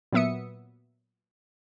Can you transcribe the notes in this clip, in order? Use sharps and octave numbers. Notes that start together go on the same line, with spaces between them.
A#2 F#3 B3 E5 D#6 C#7